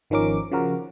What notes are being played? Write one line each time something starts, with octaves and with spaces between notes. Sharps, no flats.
G#1 D#3 F3 C#4 A#4 D6
C#3 F3 F#4 A#4